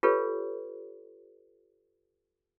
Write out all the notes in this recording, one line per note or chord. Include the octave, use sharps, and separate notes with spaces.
F4 G4 A4 B4 C#5